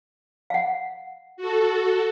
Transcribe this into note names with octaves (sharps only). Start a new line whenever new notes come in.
F5 F#5
F#4 A4